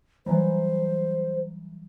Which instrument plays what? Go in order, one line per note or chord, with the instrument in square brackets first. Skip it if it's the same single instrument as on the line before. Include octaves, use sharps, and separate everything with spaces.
[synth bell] E3 F#3 G3 [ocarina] C5